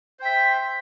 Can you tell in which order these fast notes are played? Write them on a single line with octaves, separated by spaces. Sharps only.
C5 G5 E5